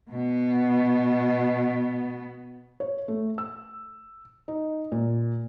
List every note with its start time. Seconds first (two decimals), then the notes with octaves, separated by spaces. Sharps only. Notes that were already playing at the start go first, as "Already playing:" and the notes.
0.11 B2 B3
2.80 C#5
3.08 A3
3.38 E6
4.48 D#4
4.92 A#2